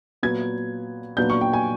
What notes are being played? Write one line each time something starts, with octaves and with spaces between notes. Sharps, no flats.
A#2 F#3 B3 G#6
A#2 F#3 B3 D4 G6
C#6
G5
G#5